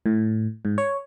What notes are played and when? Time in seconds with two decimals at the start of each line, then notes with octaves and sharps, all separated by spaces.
0.06 A2
0.65 G#2
0.78 C#5